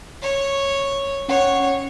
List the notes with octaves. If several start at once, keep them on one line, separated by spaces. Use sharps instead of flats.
C#5
C#4 C#5 F#5